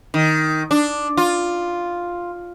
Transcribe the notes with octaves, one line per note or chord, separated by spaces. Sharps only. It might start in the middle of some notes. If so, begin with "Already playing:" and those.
D#3
D4
F4